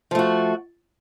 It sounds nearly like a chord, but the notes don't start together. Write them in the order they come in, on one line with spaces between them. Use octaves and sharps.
F3 A3 F#4